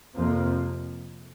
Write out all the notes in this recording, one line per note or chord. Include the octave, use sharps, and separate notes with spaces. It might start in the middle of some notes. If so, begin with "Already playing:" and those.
F2 C3 F3 A#3